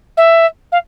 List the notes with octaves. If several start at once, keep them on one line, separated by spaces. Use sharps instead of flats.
E5
F5